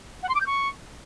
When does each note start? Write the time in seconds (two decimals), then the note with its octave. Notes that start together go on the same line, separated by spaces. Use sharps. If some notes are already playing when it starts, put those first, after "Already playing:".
0.23 F#5
0.29 C6
0.35 D6
0.40 G6
0.46 C#6